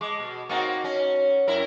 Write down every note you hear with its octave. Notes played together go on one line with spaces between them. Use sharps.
G#3 A5 C#6 D6
B2
A#3 C4 D#4 F#4 A5
C#4
F#2 E4 A#4